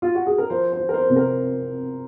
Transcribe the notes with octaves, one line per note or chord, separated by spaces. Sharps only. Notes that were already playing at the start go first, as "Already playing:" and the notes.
F4
F#4
G#4
A#4
F3 C5
C5
F3
A#4
C5
C3
A#4